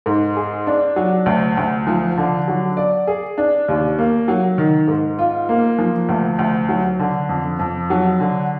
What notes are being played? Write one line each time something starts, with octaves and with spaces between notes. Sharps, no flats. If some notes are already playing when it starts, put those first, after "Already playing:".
G#2
G#4
D4
F#3
D2
D2
F3
D3
F#3
D5
G#4
D4
D#2
A#3
F#3
D#3
G#2
F4
A#3
F3
D2
D2
F#3
D3
F2
F2
F#3
D3